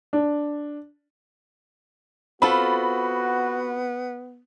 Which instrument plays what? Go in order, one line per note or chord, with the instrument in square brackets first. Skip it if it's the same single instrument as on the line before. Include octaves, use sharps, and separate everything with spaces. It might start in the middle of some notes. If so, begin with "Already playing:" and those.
[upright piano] D4
[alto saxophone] B3 [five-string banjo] C4 F4 A4 [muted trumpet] F#4 [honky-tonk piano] B5